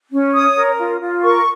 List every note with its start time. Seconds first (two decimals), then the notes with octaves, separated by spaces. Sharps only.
0.11 C#4
0.34 C#5 D#6
0.56 A#4
0.78 F4
1.01 F4
1.23 A#4 C#6